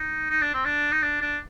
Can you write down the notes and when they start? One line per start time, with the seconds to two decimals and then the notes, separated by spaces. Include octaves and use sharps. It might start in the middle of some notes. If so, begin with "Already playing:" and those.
Already playing: D#4
0.30 D#4
0.41 D4
0.54 C4
0.65 D4
0.92 D#4
1.02 D4
1.21 D4